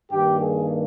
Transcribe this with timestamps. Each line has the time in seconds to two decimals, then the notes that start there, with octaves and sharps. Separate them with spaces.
0.11 G2 D#3 A#3 G4
0.40 G#4